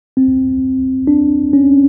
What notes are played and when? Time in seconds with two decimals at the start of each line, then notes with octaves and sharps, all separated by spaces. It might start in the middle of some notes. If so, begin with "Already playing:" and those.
0.17 C4
1.07 D4
1.53 C#4